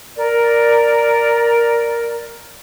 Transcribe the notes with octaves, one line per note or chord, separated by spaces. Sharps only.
A#4 D5